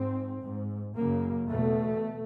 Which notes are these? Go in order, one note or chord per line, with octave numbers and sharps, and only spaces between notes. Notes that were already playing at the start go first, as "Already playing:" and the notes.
Already playing: G#2 C4
G#2
F#2 C#3 A#3
E2 B2 A3